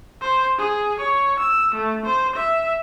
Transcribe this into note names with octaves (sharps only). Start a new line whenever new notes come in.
C5
G#4
C#5
E6
A3
C5
E5